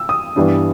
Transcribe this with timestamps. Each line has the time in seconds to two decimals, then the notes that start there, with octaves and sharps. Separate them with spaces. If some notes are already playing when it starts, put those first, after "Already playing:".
Already playing: E6
0.09 D#6
0.36 G2 E3 G3 B3 D4